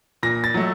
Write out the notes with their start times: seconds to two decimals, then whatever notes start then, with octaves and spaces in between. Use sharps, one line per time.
0.23 A#2 A#6
0.44 A6
0.54 F#3 A3